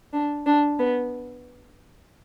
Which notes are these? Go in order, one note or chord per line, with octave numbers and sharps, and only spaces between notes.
D4
D4
B3